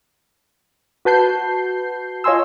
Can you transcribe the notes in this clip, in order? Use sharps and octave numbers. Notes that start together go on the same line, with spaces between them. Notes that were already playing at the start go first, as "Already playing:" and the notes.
F#4 B4 A5 G6 C7
F4 C#5 D#5 G#5 C6 E6